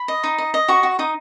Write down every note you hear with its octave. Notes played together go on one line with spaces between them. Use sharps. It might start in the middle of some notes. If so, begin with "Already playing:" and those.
Already playing: B5
D#5
D#4
D#5
D#5
F#4 C#6
F#4
D#4 D#6